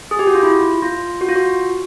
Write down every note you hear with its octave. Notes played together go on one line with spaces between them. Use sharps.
G#4
G4
F#4
F4
E4
F4
F#4
F4
F#4